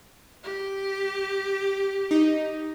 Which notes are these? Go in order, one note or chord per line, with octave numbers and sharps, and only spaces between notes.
G4
D#4